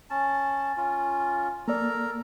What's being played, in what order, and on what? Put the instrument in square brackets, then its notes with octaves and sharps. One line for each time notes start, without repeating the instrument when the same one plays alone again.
[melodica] C#4 A5
C#4 F4
[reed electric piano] A#3 D5 [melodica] A4 A#4 A#5